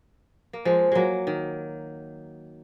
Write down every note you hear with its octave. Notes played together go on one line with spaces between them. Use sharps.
A#3
F3 G#3
F#3 G#3 A#3
D#3